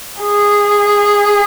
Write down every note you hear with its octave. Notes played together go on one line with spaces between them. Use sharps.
G#4